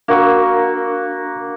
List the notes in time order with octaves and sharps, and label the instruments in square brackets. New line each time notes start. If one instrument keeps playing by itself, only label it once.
[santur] A#3 F#4 E6 [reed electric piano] D4 A#4